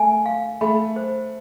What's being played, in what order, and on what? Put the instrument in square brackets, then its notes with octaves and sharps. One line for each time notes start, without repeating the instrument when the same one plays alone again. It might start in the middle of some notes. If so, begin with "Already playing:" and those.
Already playing: [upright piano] A3 [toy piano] G#5
[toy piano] F5
[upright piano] A3 [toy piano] B5
[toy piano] C5